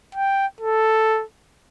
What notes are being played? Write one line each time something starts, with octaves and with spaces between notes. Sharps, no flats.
G5
A4